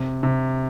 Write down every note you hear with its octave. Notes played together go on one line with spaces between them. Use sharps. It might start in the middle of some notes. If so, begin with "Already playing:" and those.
Already playing: C3
C3